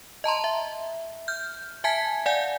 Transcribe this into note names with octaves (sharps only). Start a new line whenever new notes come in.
D#5 A5 A#5 C6
E5
F6 G6
E5 G#5 A5 G#6 B6
D5 F5 F#5 G#5 G6